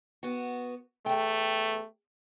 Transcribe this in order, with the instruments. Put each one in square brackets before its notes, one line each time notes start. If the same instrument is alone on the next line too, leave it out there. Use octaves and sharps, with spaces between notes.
[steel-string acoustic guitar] B3 F#4
[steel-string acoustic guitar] E2 G5 [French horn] A3